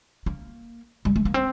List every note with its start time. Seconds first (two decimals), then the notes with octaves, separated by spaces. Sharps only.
0.26 A#3
1.05 G3
1.16 A3
1.25 A#3
1.34 C4